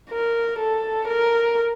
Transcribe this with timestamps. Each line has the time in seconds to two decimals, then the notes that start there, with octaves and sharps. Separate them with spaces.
0.10 A#4
0.59 A4
1.08 A#4